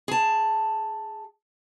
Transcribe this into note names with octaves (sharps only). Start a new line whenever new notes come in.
G#4 A5